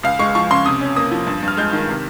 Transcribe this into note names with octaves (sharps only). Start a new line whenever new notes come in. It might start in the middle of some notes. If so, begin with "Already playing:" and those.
C#2 F5
G#3 C#6
F3 C#6
C#3 C6
C3 D#6
C#4
A#3 D#6
F3
G2
G2
F6
G#3 G6
D#3
C3